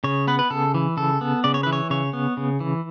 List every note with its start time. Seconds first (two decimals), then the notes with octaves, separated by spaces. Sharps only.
0.04 C#3 C#5
0.27 B3 B4
0.39 B4
0.50 C#3 A4
0.74 E3
0.97 C#3 A4
1.21 B3
1.44 C#3 D5
1.54 C#5
1.63 E3 B4
1.73 C#5
1.90 C#3 C#5
2.13 B3
2.37 C#3
2.60 E3